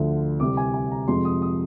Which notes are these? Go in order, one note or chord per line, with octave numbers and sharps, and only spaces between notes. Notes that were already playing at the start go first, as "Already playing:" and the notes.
Already playing: D2 D3 F3
C2 C3 G3 D6
G#5
G#5
A#5
F2 C3 F3 G#3 C6
D#6
D#6